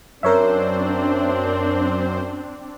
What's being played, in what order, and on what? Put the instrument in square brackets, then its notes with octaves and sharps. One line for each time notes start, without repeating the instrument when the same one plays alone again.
[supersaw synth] F#2 C5 [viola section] C4 D4 [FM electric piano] A#4 C#5 E5